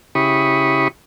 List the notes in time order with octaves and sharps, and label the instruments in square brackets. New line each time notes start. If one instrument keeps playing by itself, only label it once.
[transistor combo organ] C#3 E4 G4 B5 C#6 D#6